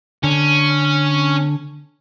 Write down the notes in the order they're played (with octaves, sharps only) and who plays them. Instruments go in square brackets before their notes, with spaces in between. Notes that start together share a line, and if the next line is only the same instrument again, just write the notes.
[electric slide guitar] D3 [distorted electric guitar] C#4